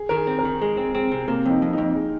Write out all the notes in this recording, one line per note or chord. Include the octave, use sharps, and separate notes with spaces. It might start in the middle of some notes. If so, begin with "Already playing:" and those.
Already playing: G#4
D#3 A#4
G#4
C4
A#4
D#3
G#3 G#4
C4
C4 G#4
C3
C3 A#3
F2 C4 D#4
F2
F2 D#4
G#4